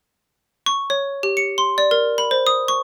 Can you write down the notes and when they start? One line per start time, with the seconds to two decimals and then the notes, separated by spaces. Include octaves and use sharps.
0.66 C#6
0.90 C#5
1.23 G4
1.37 C#7
1.58 C6
1.78 D5
1.91 A#4
2.18 B5
2.31 C5
2.47 D#6
2.68 C#6